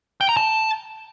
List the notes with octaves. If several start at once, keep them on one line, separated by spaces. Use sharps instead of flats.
G5
A#5
A5